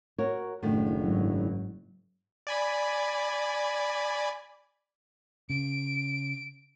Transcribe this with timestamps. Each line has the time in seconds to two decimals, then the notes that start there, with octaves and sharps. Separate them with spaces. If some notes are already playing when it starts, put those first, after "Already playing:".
0.18 F#4 A#4 C#5
0.63 F#1 A2 D3 D#3
0.99 G#2 F#3
2.47 D5 G#5 B5
5.50 C#3 D7